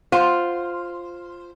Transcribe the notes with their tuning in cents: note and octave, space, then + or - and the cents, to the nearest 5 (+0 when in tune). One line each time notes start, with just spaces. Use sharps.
F4 +0 C5 +0 F#5 +0